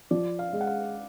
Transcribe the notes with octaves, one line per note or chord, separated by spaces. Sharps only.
F3 D5
F5
G#3
F#5
F5